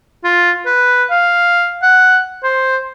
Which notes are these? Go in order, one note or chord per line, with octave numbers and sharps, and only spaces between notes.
F4
B4
F5
F#5
C5